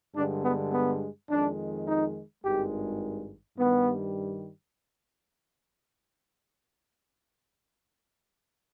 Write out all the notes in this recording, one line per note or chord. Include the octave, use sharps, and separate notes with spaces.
G2 D3 G#3 D4
B3
B3
F2 D#3 G#3 D4
D#4
G#1 G2 D#3 G#3 G4
G2 D#3 G3 B3